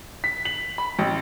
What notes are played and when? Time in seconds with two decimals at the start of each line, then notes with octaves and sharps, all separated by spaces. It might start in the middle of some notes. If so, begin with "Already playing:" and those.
0.24 B6
0.45 F#7
0.78 B5
0.99 A1